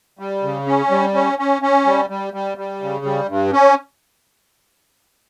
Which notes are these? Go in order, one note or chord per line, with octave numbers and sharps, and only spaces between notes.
G3
C#3
C#4
G3
C#4
C#4
C#4
G3
G3
G3
G3
C#3
G3
G2
C#4